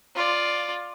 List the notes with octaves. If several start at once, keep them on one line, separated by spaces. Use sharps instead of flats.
F4 D5